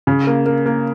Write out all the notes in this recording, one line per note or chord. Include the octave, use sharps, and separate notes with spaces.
C#3
A#3
A#3
A#3